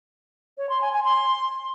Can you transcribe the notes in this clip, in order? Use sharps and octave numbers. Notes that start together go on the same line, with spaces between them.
C#5
C6
G#5
G#5
C6